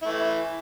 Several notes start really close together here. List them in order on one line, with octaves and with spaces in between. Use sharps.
E4 A3 E3